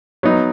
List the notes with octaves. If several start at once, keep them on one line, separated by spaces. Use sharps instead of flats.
F#3 B3 D#4